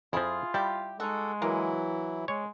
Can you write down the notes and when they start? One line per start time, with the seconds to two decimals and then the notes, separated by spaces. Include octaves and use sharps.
0.13 F2 F3 E4 F4 G#4
0.54 G3 E4 G4
1.00 G#3 D#4 F#4 A4
1.42 E3 F#3 A#3 E4
2.28 G#3 C#5